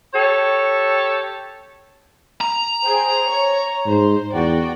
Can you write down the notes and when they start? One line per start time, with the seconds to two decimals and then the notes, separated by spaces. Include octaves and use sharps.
0.14 G4 A4 C#5
2.41 A#5
2.84 G#4 C5 G5
3.28 C#5
3.87 G#2 C5
4.34 E2 F#4 D5 G5